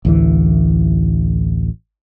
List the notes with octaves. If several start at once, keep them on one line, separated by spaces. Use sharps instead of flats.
A1 D2 E3